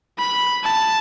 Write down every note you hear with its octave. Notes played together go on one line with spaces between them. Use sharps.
B5
A5